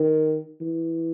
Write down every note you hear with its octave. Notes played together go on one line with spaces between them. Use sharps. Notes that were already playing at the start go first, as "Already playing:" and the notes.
Already playing: D#3
E3